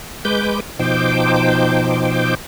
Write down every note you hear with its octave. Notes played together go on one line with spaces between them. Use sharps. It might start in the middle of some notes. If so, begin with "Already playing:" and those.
G#3 B4 D6 G6
B2 F3 D#4 C5 G5 D6